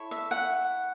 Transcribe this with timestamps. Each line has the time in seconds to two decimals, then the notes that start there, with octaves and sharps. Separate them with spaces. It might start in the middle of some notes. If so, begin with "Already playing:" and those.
Already playing: E4 A4 C#5
0.11 E5
0.31 F#5